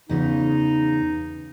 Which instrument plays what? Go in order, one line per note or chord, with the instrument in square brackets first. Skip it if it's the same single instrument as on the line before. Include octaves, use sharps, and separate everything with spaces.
[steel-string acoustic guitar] E2 C#3 F4 [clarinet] D#4